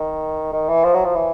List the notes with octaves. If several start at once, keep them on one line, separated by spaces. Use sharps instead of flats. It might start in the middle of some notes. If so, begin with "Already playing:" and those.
Already playing: D#3
D#3
E3
F3
F#3
F3
E3